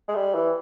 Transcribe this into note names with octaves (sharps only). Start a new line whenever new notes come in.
G#3
G3
E3